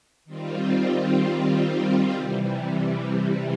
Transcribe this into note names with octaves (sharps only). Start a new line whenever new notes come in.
D#3 G3 C4 F4
C3 E3 G3